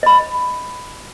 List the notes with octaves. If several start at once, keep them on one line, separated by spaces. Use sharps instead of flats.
D#5 B5